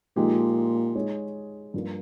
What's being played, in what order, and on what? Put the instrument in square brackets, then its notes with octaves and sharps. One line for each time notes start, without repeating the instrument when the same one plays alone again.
[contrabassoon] A#2 [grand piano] F3 G#3 D#4 G4
[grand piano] G#3 D#4 G#4 C#5
G2 F3 A#3